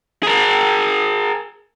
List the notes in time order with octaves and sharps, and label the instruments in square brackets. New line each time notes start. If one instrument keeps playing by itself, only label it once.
[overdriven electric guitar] G#4 A#4